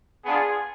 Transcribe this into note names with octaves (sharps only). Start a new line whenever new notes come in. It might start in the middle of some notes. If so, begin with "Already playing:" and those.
B3 D4 F4 G#4